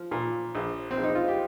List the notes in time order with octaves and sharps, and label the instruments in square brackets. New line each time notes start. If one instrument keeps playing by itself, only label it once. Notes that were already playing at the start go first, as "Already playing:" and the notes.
Already playing: [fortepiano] F3
A#2
A#1
C4
A#1
D#4
F4
G4